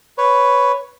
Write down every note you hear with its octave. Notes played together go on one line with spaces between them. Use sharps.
B4 C#5